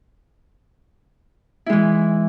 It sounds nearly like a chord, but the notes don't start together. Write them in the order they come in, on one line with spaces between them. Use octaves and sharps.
E4 G#3 E3